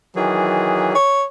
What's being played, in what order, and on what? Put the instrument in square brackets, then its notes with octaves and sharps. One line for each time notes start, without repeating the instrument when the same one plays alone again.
[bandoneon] D#3 E3 G#4 [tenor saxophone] F#3
[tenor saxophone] C#5